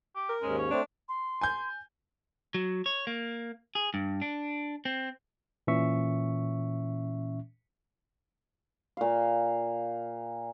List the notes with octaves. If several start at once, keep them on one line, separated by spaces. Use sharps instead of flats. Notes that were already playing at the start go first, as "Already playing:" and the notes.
G4
A#4
D#2 G#2 G#3 C#4
C#5
A3 C4 D4
C6
G#5 G6
F#3
C#5
A#3
G#4
G2
D4
C4
A#2 E3 C#4 E5 C#6
A#2 F5